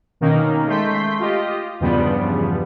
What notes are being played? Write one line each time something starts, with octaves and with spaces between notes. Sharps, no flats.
B2 D#3 A#3 C#4 D#4
G#3 A3 C6 G6 B6
F4 G4 D#5
E2 G2 C#3 F3 G3 B3